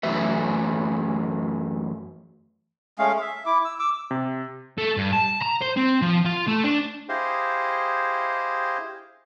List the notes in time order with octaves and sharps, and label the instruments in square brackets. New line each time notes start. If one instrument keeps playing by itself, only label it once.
[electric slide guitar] F#2 E3 F#3 A3 B4 E5
[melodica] G#3 A3 C#4 F5
E5
E4 D6
E6
D6 E6
[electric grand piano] C3
[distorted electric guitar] A3
G2
A5
A#5
C5
C4
F3
F4
A3
D4
[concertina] E4 G4 G#4 C5 D#5 F5